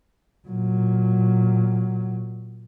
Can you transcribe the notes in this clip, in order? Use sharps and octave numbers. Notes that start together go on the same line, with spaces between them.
A#2 F#3